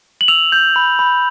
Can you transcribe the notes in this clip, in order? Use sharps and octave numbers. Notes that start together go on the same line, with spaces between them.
F#7
E6 F7
G6
B5
B5